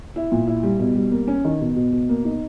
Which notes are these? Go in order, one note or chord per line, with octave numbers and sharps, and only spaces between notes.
E4
A#2
E4
G3
B2
G3
A#3
C#4
D#3
B2
B2
B2
A#3
D#4